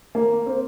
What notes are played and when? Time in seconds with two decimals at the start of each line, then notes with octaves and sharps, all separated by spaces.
0.15 A#3
0.46 C4